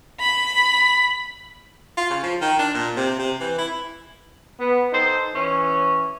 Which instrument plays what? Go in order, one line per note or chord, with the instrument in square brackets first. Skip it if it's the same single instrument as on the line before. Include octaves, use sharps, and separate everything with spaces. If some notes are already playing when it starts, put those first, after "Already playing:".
[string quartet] B5
[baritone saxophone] F4
C#3
F3
D#3
D4
A#2
C3
C3
E3
E4
[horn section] B3
D#4 A4 C5
E3 C#4